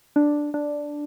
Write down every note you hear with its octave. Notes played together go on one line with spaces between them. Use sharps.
D4
D4